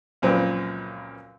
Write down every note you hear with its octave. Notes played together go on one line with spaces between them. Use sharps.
C#2 F#2 A#2 F3 C4 B4